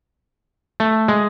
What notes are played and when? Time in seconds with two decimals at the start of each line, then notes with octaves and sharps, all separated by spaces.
0.80 A3
1.08 G#3